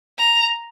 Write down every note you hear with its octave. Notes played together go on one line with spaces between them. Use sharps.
A#5